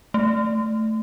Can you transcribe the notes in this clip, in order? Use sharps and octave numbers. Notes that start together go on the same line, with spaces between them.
A3